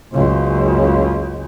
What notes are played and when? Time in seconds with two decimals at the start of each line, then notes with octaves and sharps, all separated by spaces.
0.12 F#1 C#2